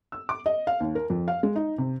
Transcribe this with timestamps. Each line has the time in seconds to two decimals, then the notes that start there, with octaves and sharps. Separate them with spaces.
0.12 E6
0.29 D6
0.46 D#5
0.67 F5
0.80 D#2
0.95 A#4
1.10 F2
1.28 F5
1.43 G#3
1.56 D#4
1.78 C3